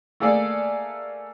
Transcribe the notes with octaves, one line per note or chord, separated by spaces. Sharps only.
A3 A#3 G#4 A4 D5